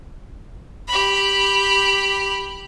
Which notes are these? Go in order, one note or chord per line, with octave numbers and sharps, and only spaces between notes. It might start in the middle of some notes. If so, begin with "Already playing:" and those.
G4 B5